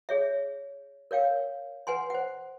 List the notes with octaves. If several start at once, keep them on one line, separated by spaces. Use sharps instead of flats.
G#4 C#5 E5
A#4 C#5 F5 G5
B4 F#5 G#5 C6
C5 F#5